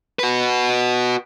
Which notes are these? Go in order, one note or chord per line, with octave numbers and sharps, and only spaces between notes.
F#4 B4